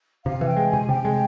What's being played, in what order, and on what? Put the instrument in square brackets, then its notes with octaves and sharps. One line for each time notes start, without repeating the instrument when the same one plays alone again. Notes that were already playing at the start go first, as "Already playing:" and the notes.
[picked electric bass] C3 [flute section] F5
[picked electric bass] E3
[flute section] G5
[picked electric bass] G#3
[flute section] G#5
[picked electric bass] C3
[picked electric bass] C3 [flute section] G5
[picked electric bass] G#3